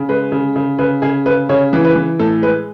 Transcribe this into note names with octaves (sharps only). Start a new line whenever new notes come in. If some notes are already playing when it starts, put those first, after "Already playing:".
Already playing: C#3
G#3 B4
C#3
C#3
C#3 B4
C#3 G#4
C#3 B4
C#3 C#5
E3
B4
E3
A2 A4
G#3 B4